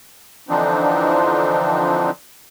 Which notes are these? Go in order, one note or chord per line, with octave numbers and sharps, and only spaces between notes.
D3 E3 F3 C4 D4 D#4